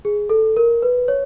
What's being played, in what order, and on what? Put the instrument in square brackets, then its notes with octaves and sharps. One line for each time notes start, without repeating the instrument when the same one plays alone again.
[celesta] G#4
A4
A#4
B4
C#5